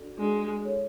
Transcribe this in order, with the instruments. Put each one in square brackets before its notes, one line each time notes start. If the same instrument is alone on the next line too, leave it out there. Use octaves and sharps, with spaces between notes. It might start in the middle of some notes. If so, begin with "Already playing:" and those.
Already playing: [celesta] D4 F#4 A4 D5
[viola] G#3 [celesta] D4 F#4 A4 D5
[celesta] E4 A4 C#5